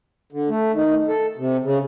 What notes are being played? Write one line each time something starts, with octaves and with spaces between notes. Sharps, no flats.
D3
A3
D#3
A4
C3
C#3